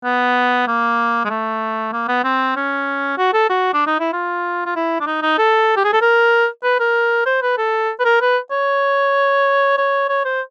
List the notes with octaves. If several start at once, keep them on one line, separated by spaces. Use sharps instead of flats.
B3
A#3
G#3
A3
A#3
B3
C4
C#4
F#4
A4
F#4
D4
D#4
E4
F4
F4
E4
D4
D#4
D#4
A4
G4
G#4
A4
A#4
B4
A#4
C5
B4
A4
B4
A#4
B4
C#5
C#5
C#5
C5